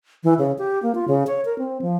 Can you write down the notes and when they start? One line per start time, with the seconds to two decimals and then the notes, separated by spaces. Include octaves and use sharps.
0.24 E3
0.39 C#3
0.58 G4
0.83 A#3
0.95 F4
1.08 C#3
1.27 C#5
1.45 A#4
1.58 C4
1.82 F3